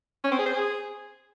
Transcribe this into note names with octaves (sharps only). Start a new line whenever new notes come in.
C#4
C4
G#4
C5
G#4